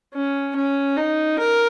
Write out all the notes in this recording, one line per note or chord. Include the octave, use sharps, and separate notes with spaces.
C#4
C#4
D#4
A#4